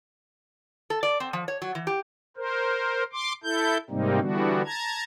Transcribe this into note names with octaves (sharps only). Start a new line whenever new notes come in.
A4
D5
C4
F3
C#5
F#3
E3
G4
A#4 C5
C6 D6
E4 A4 G6
G#2 C3 G3 A#3 C4 D#4
D3 E3 G3 B3 D4 F#4
A5 A#5 G#6